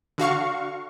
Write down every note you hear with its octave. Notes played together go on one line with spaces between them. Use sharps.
D3 F#4 F5 C#6